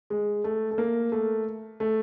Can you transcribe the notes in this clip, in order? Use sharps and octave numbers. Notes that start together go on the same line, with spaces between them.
G#3
A3
A3
A#3
A3
A3